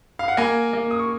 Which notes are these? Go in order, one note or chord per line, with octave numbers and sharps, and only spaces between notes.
F5
F#5
A#3 G#5
A#3
D#6
C#6